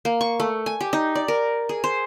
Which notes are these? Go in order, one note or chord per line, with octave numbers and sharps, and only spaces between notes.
A#3
C#6
A3
G#5
G4
D#4
D5
A#4
G#4
C5